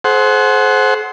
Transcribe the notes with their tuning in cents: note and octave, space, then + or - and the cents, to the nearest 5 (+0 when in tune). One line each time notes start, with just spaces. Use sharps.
G#4 +45 C5 +0 F#5 +0